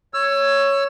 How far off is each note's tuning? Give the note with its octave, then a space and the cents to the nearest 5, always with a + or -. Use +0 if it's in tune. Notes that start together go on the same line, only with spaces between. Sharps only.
C#5 +0 E6 +25